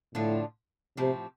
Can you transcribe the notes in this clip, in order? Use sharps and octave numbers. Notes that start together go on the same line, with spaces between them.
A2 D3 F3 D4 F4
A2 C3 F3 C4 G4